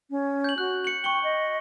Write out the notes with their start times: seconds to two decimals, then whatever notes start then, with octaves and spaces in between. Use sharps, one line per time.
0.10 C#4
0.44 G6 F#7
0.58 F#4 F#6
0.85 C#7 F#7
1.04 G5 C#6 C#7 G7
1.24 D#5